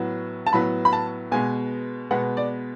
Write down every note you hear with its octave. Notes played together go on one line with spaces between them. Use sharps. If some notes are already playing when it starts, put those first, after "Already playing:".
Already playing: A2 F#3 B3
A5
A2 F#3 B3 B5
B5
A5
B2 G#3 B3 G#5
B2 G#3 B3 F#5
D5